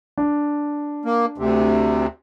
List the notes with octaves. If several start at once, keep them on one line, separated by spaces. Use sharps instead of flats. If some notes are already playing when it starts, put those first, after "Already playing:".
D4
A#3
D2 C3